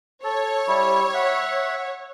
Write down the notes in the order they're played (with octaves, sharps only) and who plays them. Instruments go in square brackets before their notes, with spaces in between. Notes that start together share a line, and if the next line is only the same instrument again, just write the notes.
[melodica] A4 [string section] C#5
[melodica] G3 E4
E5 F#5